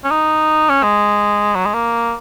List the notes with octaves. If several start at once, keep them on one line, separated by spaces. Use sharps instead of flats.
C#4
D#4
C#4
G#3
F#3
G#3
A#3